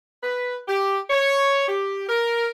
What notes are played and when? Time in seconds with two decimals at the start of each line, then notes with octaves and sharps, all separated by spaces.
0.23 B4
0.67 G4
1.10 C#5
1.68 G4
2.08 A#4